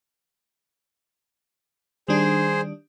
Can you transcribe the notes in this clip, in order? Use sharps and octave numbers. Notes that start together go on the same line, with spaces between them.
D#3 G3 D4 G#4 C5